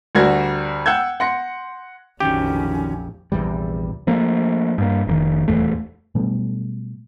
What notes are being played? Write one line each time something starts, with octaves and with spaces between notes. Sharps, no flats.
D2 G3 F#4 A#4 G#6
F#5 G5 E6 G6 G#6
F#5 C6 A#6 C#7
A#1 F2 D3 D#3 F#3 C#4 G4
A#1 E2 C3 G3
F3 A3 A#3
G2 A#3
F1 A#2 D#3
D#1 G#1 E2 A3
B2 F#3 G3 A3